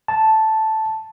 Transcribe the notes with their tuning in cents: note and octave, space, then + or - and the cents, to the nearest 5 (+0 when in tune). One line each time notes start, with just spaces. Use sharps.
A5 -5